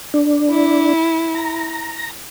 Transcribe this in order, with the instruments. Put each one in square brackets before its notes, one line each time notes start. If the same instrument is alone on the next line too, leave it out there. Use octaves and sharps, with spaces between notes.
[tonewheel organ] D4
[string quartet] E4
[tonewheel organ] A#5